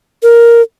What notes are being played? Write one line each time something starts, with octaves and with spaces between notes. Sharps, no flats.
A#4